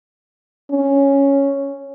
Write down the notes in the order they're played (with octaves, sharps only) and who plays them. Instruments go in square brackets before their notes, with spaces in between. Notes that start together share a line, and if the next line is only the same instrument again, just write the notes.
[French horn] C#4